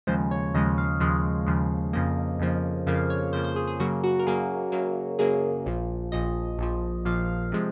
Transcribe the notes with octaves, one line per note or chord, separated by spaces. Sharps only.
D#2 C#3 F3 G#3 C5
C#5
D#2 C#3 F3 G#3 D#5
F5
D#2 C#3 F3 G#3
D#2 C#3 F3 G#3
F2 C#3 F3 A#3 D#5
F2 C#3 F3 A#3
F2 C#3 F3 A#3 F5
C#5
F2 C#3 F3 A#3 C5
C5
G#4
G#4
F#2 C#3 F#3 A#3 F#4
F#4
A#4
F#2 C#3 F#3 A#3 G#4
F#2 C#3 F#3 A#3
F#2 C#3 F#3 A#3 G#4
A#1 A#2 F3
A#1 A#2 F3 D#5
A#1 A#2 F3
A#1 A#2 F3 F5
C3 F3 G#3